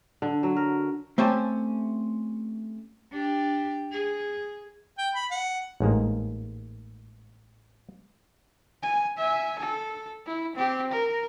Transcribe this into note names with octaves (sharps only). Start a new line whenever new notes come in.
D3
F#3
A#4
A3 C4 C#4 G4 A5
D4 G4
G#4
G5
B5
F#5
A1 G#2 G#3 A#3
G#5
E5 G#5
A4
E4
C4 G4
A#4